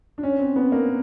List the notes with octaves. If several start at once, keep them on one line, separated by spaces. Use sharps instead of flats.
D4
C#4
C4
B3
A#3